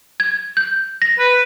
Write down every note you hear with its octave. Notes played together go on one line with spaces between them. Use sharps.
G#6
G6
A#6
B4